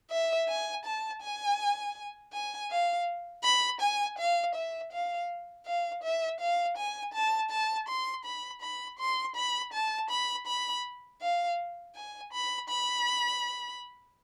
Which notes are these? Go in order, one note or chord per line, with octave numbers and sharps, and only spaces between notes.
E5
G#5
A5
G#5
G#5
F5
B5
G#5
F5
E5
F5
F5
E5
F5
G#5
A5
A5
C6
B5
B5
C6
B5
A5
B5
B5
F5
G#5
B5
B5